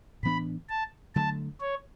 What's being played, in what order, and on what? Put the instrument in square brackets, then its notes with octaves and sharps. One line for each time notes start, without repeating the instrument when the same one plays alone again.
[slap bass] A2 E3 B3 D4 [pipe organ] B5
[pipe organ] A5
[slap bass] D3 F#3 A3 [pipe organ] A5
[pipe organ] C#5